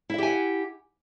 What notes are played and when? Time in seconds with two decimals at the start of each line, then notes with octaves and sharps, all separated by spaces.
0.10 E4
0.14 E5
0.18 G4
0.23 G#5
0.27 F#5